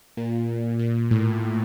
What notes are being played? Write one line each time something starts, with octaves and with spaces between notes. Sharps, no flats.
A#2
A#2
A2